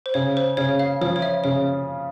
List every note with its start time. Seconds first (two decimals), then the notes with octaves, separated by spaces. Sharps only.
0.06 C5
0.14 C#3 C#5
0.37 C5
0.57 C#3 C#5
0.79 F5
1.01 F3 C#5
1.16 C#5
1.22 E5
1.44 C#3 C#5